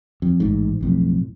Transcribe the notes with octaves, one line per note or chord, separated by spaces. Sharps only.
F2
A1 G#2
B1 F2 A2